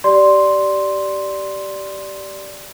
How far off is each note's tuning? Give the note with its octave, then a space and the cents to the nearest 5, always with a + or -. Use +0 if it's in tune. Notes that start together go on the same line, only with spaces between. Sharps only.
G4 -20 D5 -5 C6 +0